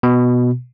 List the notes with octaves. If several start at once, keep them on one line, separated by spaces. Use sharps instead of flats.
B2